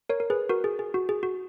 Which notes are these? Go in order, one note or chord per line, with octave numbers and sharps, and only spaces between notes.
A#4 C#5
A#4
G#4 B4
F#4 A#4
G#4
G#4
F#4
G#4
F#4